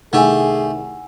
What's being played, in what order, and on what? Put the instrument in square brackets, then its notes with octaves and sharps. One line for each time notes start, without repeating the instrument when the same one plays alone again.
[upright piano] C2 D#3 E6 [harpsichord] A3 G4 [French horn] G#4 [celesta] F#5 G#5